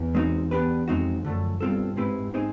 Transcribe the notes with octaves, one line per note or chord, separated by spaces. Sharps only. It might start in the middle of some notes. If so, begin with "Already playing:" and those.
Already playing: E2
G#3 C4 D#4 F#4
B3 D4 G4 B4
F2 G#3 C4 D#4 F#4
F#2 D3 F3 A3
G2 B2 G3 C4 F4 A4
G#2 G#3 C4 E4 G4 B4
C4 D#4 G#4 C5